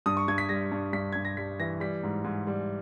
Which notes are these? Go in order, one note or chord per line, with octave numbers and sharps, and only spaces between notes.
G2 D#6
C#6
G2 G#6
B6
G3 A#6
G2
G2 B6
G2 G#6
A#6
G3 B6
E3 A#6
G3 B6
G#2
G#2
G3